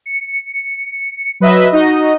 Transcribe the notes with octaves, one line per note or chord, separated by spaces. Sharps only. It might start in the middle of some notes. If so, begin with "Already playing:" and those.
C#7
F#3 B4 D#5 E5
D#4 F#4 D#5